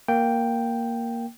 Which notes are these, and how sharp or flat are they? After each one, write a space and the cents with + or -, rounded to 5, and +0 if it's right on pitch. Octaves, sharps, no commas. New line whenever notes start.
A#3 +0 G5 +0